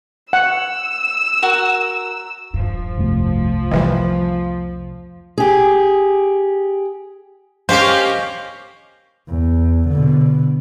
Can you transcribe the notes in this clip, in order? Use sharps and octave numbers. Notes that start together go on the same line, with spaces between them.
F#5 E6
F#4 A#4
D#1 G2 F3
C2 F2 A3
C3 D#3 E3 G3 B3
G4 G#4
A#3 C#4 G4 C5 D#5 F5
E2
B2 D3